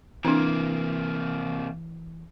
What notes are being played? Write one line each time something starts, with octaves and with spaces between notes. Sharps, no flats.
C3 E3 A#3 C4 D4